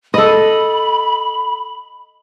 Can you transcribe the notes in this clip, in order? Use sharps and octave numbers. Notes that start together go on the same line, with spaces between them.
A4 D#5 B5